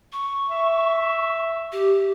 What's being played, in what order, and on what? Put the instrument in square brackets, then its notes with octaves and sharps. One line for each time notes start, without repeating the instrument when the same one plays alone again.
[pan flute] C#6
[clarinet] E5
[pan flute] G4